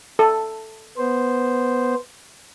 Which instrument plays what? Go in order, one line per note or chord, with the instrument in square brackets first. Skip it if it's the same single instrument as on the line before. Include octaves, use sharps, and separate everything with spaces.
[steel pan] A4
[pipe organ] B3 C5